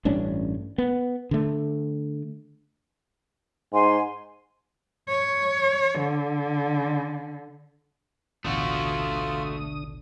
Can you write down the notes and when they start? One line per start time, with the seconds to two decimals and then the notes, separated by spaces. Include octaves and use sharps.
0.05 A1 G2 C#4 D4
0.78 B3
1.31 D3 A3
3.73 G#2 G#5 C6
5.08 C#5
5.98 D3
8.45 A1 D2 B2 D3 A3 F4 F#4 D#6